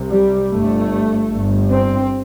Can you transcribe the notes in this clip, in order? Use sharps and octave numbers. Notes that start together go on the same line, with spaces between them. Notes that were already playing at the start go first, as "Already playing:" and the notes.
Already playing: C2 C3
G3
G1 G2 A3
G1 G2
C4